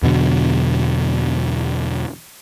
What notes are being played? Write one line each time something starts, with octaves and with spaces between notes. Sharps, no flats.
E2 B2 D3 F#3